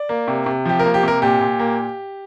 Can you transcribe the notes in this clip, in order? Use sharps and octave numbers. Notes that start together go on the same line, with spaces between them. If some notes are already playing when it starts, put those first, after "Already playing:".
Already playing: D5
A#3
C3
C3
F3 G4
A#4
A#3
G4
C3 A#4
A#2 G4
A#2
A#3